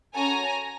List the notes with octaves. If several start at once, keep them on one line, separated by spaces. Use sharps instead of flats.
C#4 F#4 A4 G#5 A#5